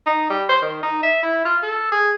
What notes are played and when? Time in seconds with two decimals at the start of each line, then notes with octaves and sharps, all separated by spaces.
0.07 D#4
0.30 G3
0.49 C5
0.62 D#3
0.83 D#4
1.03 E5
1.23 E4
1.45 F4
1.63 A4
1.92 G#4